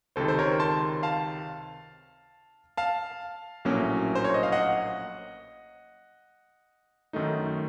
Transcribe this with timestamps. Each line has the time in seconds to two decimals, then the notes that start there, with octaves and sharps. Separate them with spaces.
0.16 C#2 C3 D#3 A4 C5
0.28 C5
0.39 A#4 C#5
0.60 A5 C6
1.03 F5 A5
2.77 F5 A5
3.65 A#1 A2 F#3 A#3 C#4
4.15 C5
4.24 C#5
4.34 D#5
4.43 F5
4.52 D#5 F#5
7.13 F#2 D#3 A3 D#4